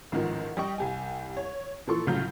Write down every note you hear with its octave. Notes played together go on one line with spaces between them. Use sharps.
A1 G#2 D#3 F3
G3 D#5 G5 C#6
C2 G4 G#5
C#5
A#2 E3 F3 A4 C6 C#6
C2 A2 C#3 F#3 F4 G6